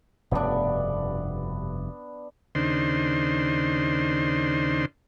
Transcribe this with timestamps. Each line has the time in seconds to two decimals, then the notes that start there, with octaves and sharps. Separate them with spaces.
0.31 F1 G2 B2 B3 D4
2.55 D#2 C#3 D4 D#4 C5 C6